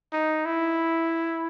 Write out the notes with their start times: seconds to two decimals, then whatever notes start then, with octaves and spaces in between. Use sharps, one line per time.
0.13 D#4
0.45 E4